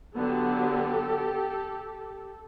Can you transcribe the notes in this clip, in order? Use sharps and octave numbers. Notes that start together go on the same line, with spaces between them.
D3 F#3 B3 D4 G4 A4